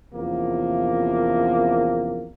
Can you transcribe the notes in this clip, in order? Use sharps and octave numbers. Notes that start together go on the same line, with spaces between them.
E2 C3 F3 A#3 B3 C#4